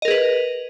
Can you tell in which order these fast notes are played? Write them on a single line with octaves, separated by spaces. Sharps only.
D#5 A#4 G#4 B4